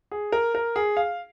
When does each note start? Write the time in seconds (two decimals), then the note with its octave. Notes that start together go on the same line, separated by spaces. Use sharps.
0.11 G#4
0.32 A#4
0.55 A#4
0.76 G#4
0.97 F5